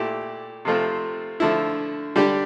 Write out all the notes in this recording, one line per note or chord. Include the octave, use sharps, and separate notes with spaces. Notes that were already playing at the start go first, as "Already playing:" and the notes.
Already playing: A#2 A3 E4 G4
C3 F3 A3 C4 F4
D3 F3 A3 E4
D3 G3 D4 G4